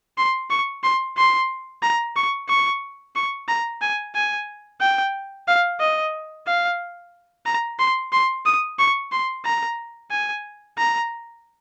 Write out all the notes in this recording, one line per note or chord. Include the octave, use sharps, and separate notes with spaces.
C6
C#6
C6
C6
A#5
C#6
C#6
C#6
A#5
G#5
G#5
G5
F5
D#5
F5
A#5
C6
C6
D#6
C#6
C6
A#5
G#5
A#5